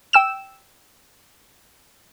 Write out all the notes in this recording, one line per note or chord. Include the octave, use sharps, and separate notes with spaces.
G5 E6 E7